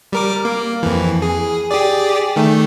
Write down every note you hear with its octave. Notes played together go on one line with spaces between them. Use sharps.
G3 A#4 D6
A#3
F2 E3
G#4
G4 G#4 D5
D#3 A3